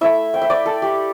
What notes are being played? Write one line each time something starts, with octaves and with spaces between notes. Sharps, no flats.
A3 E4 E5
G5
E5
D5
A4
G4